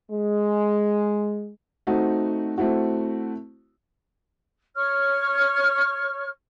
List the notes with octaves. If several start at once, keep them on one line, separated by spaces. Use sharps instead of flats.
G#3
A3 C4 D#4 F#4
A3 C4 E4 F#4
C#5 C#6 F6